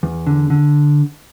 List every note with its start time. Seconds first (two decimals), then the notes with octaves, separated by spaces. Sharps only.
0.03 E2
0.27 D3
0.50 D3